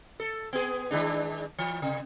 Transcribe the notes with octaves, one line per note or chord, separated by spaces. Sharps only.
A4
B3 G#4
D#3 G#3 D4
E3
C3